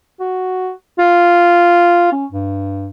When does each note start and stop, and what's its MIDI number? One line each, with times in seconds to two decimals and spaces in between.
0.20 0.71 66
0.99 2.11 65
2.12 2.26 61
2.32 2.89 43